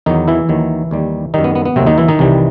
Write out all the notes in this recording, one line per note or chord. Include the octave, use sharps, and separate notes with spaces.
E2 D#3 F#3 D#4
E3 E4
D#2 D#3 F#3
D#2 D#3 G3
F#2 D#3 G3 D#4
B3
B3
B3
D#2 C3 D#3 F#3 C4
D#3 D#4
E3 E4
D#3 D#4
C2 C3 E3 G3